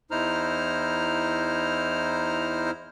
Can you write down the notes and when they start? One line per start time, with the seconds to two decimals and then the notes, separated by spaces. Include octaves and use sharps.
0.11 E2 D#4 E4 C5 A#5 F6